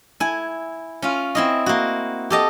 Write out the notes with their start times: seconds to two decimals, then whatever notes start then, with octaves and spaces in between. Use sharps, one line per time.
0.20 E4 G#5
1.02 C#4 F4
1.35 C4 E4 D#5
1.66 A#3 F#4
2.30 G4 A4 D#5